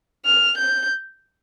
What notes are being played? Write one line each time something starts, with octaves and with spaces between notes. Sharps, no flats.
F6
G6